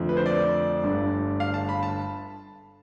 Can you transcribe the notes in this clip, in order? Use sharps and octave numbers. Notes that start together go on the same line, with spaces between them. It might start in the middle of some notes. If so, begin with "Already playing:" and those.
Already playing: F2 D3 F3 A3
B4
C5
D5
G1 G2 D3 A3
F5
A5
B5
A5